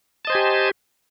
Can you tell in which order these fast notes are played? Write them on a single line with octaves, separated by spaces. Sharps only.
A5 D#5 C5 G#5 G4